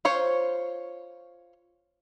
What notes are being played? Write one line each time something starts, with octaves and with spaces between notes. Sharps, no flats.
F4 C5 C#5